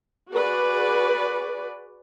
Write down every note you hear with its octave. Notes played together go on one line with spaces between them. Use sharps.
F#4 G#4 B4 D5